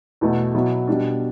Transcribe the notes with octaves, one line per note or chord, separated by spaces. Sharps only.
E2 B2 A3
B2 F#3 B3 E4
B2 G3 D4